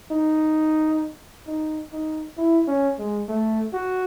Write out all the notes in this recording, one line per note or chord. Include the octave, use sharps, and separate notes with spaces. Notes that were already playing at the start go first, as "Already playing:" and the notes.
D#4
D#4
D#4
E4
C#4
G#3
A3
F#4